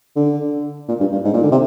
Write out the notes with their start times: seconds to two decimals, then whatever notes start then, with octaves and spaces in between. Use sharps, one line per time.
0.16 D3
0.88 A#2
1.00 G2
1.12 G2
1.24 G#2
1.33 A#2
1.43 D3
1.51 C3